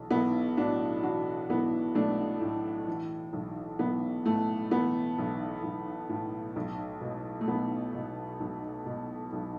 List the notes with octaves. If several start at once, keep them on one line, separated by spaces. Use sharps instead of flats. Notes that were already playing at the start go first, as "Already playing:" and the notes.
Already playing: B1 E3
B1 B3 E4
A2 D4 F#4
E3 D4 F#4
B1 B3 E4
B1 A3 D4
A2
E3
B1
B1 B3
A2 A3
E3 B3
B1
B1
A2
B1
B2
A3
B1 B3
B2
B1
B2
B1